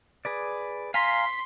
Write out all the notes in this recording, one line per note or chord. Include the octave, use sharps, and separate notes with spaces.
G#4 B4 D5
F5 G#5 A#5 C6 B6